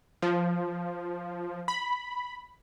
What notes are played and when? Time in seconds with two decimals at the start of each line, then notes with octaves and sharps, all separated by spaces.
0.22 F3
1.68 B5